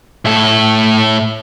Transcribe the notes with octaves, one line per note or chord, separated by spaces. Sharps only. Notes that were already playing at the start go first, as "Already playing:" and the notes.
A2 A4